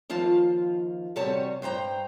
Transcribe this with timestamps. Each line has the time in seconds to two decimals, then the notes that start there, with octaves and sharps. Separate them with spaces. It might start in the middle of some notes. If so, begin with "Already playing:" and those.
0.10 D#2 F3 F4 A5
1.16 E2 C3 G3 F#4 C#5 A5
1.62 G2 C5 G5 A#5